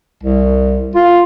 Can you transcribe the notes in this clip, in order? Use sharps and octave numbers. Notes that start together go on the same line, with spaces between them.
C2
F4